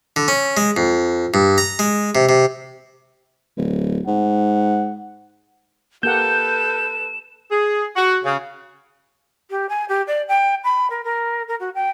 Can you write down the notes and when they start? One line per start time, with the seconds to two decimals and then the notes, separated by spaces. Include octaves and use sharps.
0.16 D3
0.28 C#4
0.57 G#3
0.77 F2
1.34 G2
1.58 A#5
1.79 G#3
2.15 C3
2.29 C3
3.57 D1
4.07 G#2 F#5
6.03 A#3 G4 A4 B4 F#5 G6 E7
7.51 G#4
7.95 F#4
8.24 C#3
9.50 G4
9.69 G#5
9.89 G4
10.07 D5
10.28 G5
10.64 B5
10.90 A#4
11.04 A#4
11.48 A#4
11.60 F#4
11.75 G5